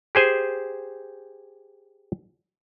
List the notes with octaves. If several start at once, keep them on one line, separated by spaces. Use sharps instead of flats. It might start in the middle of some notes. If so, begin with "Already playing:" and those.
G4 G#4 C5 G#5